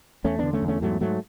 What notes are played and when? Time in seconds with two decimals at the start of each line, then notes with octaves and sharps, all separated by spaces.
0.24 E2 A3 C#4
0.39 D3 B3 D4
0.53 A3 C#4
0.62 E2
0.68 A3 C#4
0.82 G#2 F#3 A3
1.00 G#2 F#3 A3